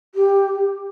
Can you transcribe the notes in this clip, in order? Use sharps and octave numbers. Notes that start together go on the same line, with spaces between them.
G4